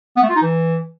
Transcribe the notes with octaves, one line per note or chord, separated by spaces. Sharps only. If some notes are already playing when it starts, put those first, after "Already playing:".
B3
A3
F4
D#4
E3